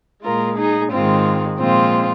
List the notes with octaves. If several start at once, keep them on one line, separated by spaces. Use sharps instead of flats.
A#2 G#3 F4 A#4
D#4 G#4
G#2 D#3 G#3 C4 F4
A#2 F3 G#3 C4 F4